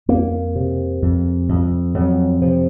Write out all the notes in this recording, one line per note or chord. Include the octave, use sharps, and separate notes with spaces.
F2 A#3
C3
F2
F2
F2 F#3
C3 F3